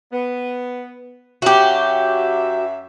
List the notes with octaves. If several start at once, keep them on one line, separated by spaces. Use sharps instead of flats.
B3
F#2 F#3 F#4 G4 E5